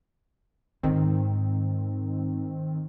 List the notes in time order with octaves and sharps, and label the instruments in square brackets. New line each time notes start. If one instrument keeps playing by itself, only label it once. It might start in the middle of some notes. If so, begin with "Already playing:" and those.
[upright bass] G#2 [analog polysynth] D#3 C4